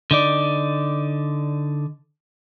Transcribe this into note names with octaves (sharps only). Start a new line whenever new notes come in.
D3 D#4 D5